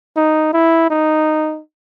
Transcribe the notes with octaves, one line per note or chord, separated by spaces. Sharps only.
D#4
E4
D#4